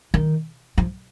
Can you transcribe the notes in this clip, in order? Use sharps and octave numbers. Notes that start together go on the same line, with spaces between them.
D#3
F3